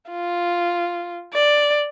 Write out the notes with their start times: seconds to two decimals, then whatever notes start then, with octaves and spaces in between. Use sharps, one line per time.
0.10 F4
1.34 D5